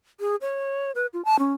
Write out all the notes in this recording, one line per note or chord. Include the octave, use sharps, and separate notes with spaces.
G#4
C#5
B4
F4
A5
C#4